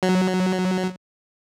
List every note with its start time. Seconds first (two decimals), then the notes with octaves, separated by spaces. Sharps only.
0.03 F#3